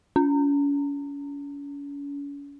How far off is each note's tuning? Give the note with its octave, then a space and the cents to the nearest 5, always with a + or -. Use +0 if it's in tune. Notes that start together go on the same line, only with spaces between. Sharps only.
C#4 +40